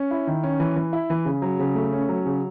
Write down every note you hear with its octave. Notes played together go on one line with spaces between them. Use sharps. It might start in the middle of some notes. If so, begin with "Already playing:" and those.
Already playing: C#4
E4
D#3
C#4
E3
E3
E4
E3
C#3
F#3
C#3
A3
C#4
F#3
C#3